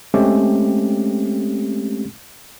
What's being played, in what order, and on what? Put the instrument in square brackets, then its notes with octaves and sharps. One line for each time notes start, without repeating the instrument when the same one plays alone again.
[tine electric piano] G#3 A3 C4 C#4 G4